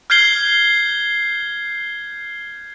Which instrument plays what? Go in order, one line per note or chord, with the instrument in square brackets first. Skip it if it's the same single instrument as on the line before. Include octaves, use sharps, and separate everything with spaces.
[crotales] F6 G6 G#6 C7 G7